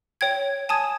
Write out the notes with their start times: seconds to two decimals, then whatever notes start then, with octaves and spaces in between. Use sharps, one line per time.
0.21 C#5 G5 G#6
0.69 G#5 A5 D#6 G#6